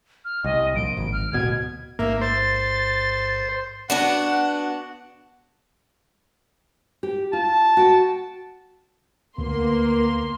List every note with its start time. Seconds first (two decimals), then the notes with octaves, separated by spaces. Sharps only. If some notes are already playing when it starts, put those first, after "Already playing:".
0.25 F6
0.44 C2 D#5
0.75 A#1 D7
0.97 G#1
1.12 F6
1.33 D1 B2 G#6
1.99 A1 G#2 A#3 E5
2.21 C5 A6
3.90 B3 D4 F#4 F#5
7.03 G4
7.33 F4 A5
7.77 F#4 G5
9.38 D2 A#3 B3 C6